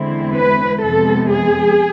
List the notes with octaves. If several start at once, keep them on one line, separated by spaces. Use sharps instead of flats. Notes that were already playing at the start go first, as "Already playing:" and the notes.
Already playing: E2 D3 G#3 C4 E4
B4
F2 C3 G#3 B3 A4
G#4